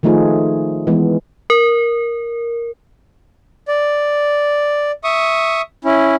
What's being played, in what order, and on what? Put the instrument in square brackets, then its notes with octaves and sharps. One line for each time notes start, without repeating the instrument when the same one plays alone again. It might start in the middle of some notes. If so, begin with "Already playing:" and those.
[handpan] D#3 F3 A3 D#4 F4 G#4
E3 G#3 B3
[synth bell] A#4
[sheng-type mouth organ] D5
E5 C#6 D#6
C#4 E4